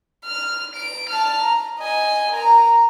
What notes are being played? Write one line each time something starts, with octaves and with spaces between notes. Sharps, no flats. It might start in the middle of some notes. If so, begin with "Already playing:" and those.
F6
D7
A5 F6
A#5
D#5 G#5
A#4 A#5